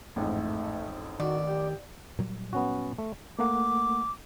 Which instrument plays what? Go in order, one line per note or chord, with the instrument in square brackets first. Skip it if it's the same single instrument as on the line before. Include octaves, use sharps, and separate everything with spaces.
[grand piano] A1 F2 G#2 [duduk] A3
[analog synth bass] D#3 [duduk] F#4 [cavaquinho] D5
[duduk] G4
[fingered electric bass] A#2 F#3 G3
[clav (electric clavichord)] B3 C#4 F#4
A3
[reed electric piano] A3 A#3 F#5 [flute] D6